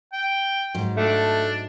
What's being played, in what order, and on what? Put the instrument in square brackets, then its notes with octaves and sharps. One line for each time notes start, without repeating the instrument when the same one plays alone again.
[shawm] G5
[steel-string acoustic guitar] G#2 F#3
[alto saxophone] A3 [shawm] D4